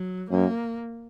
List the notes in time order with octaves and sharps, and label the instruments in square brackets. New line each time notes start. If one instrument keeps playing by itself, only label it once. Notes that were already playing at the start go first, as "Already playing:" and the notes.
Already playing: [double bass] F#3
[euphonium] F#2 [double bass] A#3